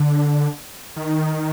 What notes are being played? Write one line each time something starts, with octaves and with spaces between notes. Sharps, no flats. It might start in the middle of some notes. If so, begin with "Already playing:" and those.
Already playing: D3
D#3